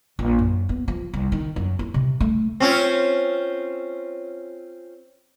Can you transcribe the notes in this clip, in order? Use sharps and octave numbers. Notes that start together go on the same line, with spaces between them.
A#1
F#2
B3
F3
C2
D#3
F#2
E4
C3
A3
C4 C#4 F4